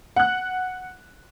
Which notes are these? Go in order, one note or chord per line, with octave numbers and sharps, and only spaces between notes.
F#5 F#6